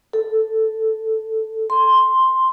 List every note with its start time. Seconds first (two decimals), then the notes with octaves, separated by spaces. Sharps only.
0.13 A4
1.70 C6